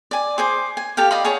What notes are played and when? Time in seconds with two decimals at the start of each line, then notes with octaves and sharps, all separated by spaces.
0.11 D5 G#5
0.38 G#4 C5 D6
0.77 G#5
0.97 G4 A4 F5 G5
1.11 D5 D#5 F5 B5
1.25 G#4 C#5 F#5 A5